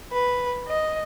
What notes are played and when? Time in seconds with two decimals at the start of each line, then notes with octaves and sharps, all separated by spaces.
0.13 B4
0.68 D#5